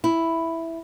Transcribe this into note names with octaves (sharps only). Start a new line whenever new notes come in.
E4